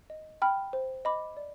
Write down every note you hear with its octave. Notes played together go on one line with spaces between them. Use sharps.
D#5
G5 B5 F6
C5
D#5 B5 D6
D5